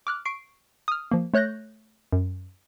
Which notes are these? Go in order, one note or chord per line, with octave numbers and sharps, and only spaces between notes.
D6 F6 F#6
C#6 C7 D7
D#6 F6
F3 A#3
A3 C#5 F#6 G6 A#6
F#2